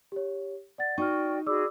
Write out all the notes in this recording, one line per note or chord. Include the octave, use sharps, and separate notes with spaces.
G4 C#5
D5 F#5 A6
D#4 F#4 D5 G5 C#6 F6
F#4 G#4 D5 B5 D6 E6